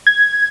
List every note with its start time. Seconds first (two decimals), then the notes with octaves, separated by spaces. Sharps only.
0.07 G#6